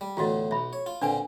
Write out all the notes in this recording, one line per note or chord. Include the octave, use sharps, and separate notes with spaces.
G3
E2 A2 D3 F4 F#4 D#5
B1 E5 B5
C#5
F4
A#2 D3 C4 D4 B4 G#5